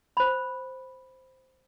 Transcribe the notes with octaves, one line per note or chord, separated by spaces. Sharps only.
C5 B5